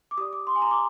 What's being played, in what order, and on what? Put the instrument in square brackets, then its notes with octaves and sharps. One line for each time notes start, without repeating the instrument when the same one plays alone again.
[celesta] D6
G4 D#6
D5
D6
C6
G#5
A#5
D6